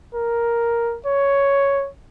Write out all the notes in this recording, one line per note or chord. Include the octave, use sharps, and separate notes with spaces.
A#4
C#5